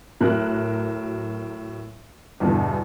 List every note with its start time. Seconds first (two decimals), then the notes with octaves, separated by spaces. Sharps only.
0.20 A2 F#3 A#4 F#6
2.40 E2 G2 B2 D3 E3